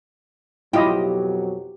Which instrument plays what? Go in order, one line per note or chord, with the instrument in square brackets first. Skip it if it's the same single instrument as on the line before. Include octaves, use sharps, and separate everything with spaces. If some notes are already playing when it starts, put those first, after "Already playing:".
[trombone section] F2 B2 F#3 [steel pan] E4 F4 D#5 [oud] G4